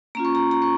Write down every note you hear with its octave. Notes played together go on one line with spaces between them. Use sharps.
A#3 C#4 F4 A#5
C#6
A#5
A#5
C#6